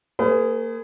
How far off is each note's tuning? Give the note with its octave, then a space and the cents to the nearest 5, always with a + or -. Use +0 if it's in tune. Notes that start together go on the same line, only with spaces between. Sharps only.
A#3 -30 G#4 +0 B4 +45